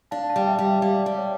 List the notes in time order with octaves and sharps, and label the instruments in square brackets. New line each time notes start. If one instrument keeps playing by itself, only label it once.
[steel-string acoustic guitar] D4 [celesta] F5 A5
[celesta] F5 A5
[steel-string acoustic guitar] G3
[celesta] E5 G5
[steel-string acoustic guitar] G3
[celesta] E5 G5
[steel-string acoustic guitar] G3 [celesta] D5 F5
[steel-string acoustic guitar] G3
[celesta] C#5 E5